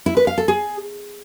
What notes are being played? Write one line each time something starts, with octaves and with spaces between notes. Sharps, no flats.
E4
B4
F5
A4
G#4